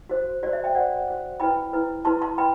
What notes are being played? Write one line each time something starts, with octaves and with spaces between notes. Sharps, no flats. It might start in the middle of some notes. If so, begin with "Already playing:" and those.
F#4 C5
F#4 C5 D5
E5
E5 G5
F#4 C5 D5 F#5
F#4 C5
E4 B4 G5 B5
E4 B4
E4 B4 A5 C6
A5 C6
B4 G5 B5